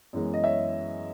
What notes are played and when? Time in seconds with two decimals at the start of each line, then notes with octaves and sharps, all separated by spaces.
0.13 F#2 E3 G#3 B3
0.34 D#5
0.44 C#5 E5